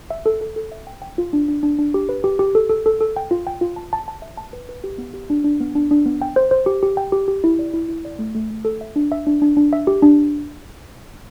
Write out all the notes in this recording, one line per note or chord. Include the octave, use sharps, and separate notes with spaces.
E5
A4
A4
A4
E5
G5
G5
F4
D4
D4
D4
D4
G4
B4
G4
G4
A4
A4
A4
A4
G5
F4
G5
F4
A5
A5
A5
E5
A5
B4
B4
G4
B3
G4
D4
D4
B3
D4
D4
B3
G5
C5
C5
G4
G4
G5
G4
G4
E4
D5
E4
E4
D5
A3
A3
A3
A4
E5
D4
E5
D4
D4
D4
E5
G4
D4